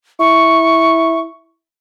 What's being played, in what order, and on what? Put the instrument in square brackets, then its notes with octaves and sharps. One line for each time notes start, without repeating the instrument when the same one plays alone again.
[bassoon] E4 [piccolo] C#6